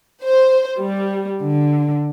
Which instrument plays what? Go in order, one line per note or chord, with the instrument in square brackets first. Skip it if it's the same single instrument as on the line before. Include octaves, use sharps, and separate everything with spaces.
[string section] C5
G3
D3